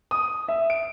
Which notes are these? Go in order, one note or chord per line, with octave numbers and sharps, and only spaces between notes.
D#6
E5
D7